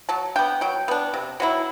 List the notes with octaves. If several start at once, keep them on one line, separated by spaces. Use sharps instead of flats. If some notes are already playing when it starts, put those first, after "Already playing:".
F#3 A5
B3 D4 G5
F#3 G5
B3 D4
C3
F#3 C4 E4